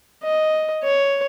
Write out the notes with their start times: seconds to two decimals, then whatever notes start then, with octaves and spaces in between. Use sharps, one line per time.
0.24 D#5
0.84 C#5